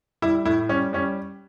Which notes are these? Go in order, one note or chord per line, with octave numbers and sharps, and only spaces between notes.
G3 E4
A2 E4
G3 C#4
G3 C#4